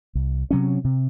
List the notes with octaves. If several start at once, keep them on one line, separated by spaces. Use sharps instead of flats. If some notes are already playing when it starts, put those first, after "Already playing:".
C2
C3 F#3 C#4
C3